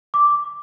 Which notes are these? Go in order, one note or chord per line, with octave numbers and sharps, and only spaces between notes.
D6